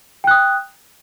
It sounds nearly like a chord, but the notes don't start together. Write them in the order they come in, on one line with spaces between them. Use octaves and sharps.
G5 F#6 D#6